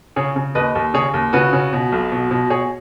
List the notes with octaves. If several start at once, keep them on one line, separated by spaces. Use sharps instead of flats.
C#3 G#4 C#5
C#3
D#2 B4 D#5
D#2
C#3 G#4 C#5
D#2
C#3 F#4 B4
C#3
B2
B1
B2
B2
B2 G#4 C#5